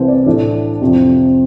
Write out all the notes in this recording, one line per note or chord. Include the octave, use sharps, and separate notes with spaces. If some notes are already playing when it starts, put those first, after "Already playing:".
Already playing: C2 C3 E3 B4 C5
D5
A2 E3 A3 D4
F2 C3 F3